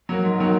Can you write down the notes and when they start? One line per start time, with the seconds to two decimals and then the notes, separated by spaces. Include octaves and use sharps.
0.09 F#3 A#3
0.24 G#2
0.38 D#3 F#3 A#3